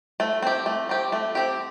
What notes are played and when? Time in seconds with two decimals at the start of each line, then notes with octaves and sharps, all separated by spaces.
0.20 A3
0.42 C4 G4
0.66 A3
0.89 C4 G4
1.12 A3
1.35 C4 G4